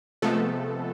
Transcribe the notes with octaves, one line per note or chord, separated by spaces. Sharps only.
C3 F3 G#3 A3 B3 A4